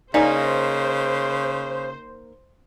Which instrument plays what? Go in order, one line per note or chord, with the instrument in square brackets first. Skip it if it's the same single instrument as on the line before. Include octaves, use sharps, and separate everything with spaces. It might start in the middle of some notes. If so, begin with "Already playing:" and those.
[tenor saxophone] C#3 [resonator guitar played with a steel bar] A#3 D#4 [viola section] C5 [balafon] D5 G#5